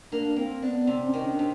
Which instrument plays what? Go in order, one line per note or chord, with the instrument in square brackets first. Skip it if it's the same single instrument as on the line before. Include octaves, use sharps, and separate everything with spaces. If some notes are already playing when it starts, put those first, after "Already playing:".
[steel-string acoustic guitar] A#3 [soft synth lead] D4
[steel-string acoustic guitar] A#3 [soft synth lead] C4
[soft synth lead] B3 [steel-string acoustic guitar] D4
[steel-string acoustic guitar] C3 [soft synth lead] C4
[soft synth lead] C#4
[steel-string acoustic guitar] D#3
[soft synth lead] D4
[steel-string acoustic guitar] C3